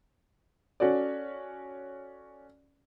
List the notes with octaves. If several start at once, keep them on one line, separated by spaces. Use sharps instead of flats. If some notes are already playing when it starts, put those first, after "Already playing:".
C#4 F#4 A4 D5